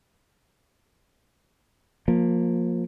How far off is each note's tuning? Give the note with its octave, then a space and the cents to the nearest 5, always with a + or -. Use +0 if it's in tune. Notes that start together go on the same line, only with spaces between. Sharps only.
F3 +20 A#3 +0